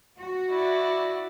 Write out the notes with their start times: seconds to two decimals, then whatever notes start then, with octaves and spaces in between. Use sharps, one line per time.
0.17 F#4
0.50 E4 D5